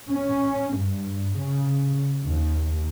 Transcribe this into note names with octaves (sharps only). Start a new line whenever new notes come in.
C#4
G2
C#3
D#2